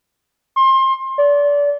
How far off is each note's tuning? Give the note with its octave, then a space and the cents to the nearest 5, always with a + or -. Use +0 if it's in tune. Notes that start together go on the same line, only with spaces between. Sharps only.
C6 +30
D5 -30